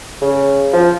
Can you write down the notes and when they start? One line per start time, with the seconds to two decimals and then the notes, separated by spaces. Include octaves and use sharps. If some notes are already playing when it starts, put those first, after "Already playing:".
0.22 C#3
0.73 F3